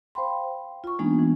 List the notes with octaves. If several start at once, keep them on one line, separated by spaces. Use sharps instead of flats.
C5 F5 G5 B5 C6
F4 C#6
E3 G#3 A#3 B3 D4 D#4
E3